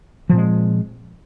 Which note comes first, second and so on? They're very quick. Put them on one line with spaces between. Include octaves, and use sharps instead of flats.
F3 A#2 C4 G#3